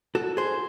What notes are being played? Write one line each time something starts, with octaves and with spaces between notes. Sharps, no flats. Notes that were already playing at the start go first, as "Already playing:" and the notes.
F#4 A4
G#4 C5